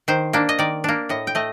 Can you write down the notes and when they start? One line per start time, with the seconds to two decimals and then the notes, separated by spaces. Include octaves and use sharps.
0.08 D#3 C5
0.33 A#3 D4
0.49 D#5
0.59 D#3 D5
0.84 A#3 D4
1.09 A2 D#5
1.27 G5
1.35 A3 D#5